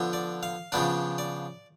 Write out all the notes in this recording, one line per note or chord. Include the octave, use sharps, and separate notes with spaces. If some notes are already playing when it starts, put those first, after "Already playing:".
Already playing: D3 F3 B3 D4
D5
F5
C#3 F3 B3 D4 D5
D5